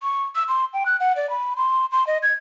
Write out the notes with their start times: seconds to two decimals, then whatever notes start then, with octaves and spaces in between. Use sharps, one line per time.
0.03 C#6
0.35 E6
0.49 C6
0.73 G5
0.86 F#6
1.00 F#5
1.16 D5
1.30 B5
1.57 C6
1.92 C6
2.07 D#5
2.23 G#6